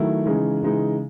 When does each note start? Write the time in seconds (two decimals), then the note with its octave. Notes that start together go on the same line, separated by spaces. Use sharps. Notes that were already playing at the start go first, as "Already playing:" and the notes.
Already playing: D#3 F#3 A3 E4
0.25 C#3 E3 G#3 D#4 G#4
0.62 C#3 E3 G#3 D#4 G#4